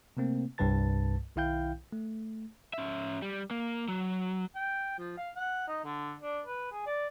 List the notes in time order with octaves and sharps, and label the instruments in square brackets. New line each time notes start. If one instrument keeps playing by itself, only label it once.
[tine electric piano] C3 A3 A#3 C4
C2 G2 G3 B4 A5 A6
B1 D#3 E4 F5 G5 G6
A3
[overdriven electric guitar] C#4 E5
G3
A#3
F#3
[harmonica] G5
F3
F5
F#5
D#4
D3
D4
B4
G#4
D5